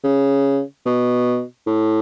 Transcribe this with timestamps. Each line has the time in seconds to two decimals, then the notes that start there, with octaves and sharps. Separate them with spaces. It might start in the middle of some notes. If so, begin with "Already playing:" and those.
0.04 C#3
0.86 B2
1.67 A2